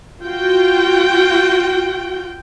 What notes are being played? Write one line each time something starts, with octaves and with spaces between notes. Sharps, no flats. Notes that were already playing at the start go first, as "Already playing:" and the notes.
F4 F#4 G5